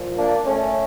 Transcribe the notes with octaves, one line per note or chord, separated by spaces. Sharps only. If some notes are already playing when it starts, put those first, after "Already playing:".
Already playing: A#2 F3
A#3 D4
A3 C#4